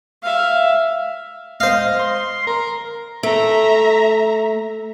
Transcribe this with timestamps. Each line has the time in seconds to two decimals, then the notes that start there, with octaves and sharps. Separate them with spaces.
0.23 E5 F5
1.60 C5 D#5 F5
1.99 C6
2.47 A#4
3.23 A3 E5 A#5